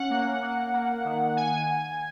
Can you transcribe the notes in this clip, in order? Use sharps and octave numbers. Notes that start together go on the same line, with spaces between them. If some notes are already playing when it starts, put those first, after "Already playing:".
Already playing: C#4 F#5
A#3
A#3
A#3
D#3
G#5